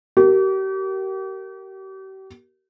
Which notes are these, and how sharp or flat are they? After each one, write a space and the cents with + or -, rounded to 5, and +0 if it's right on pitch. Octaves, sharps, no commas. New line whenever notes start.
G4 -40 A#4 -15